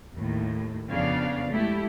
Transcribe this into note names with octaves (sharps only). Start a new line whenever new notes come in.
D#2 A2
F2 C#3 B3 D4 D5 F5
G#3 A3 E4 G4